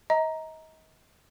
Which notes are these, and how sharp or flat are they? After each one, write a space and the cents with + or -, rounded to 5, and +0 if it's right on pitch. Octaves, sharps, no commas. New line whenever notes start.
D#5 +35 A#5 +0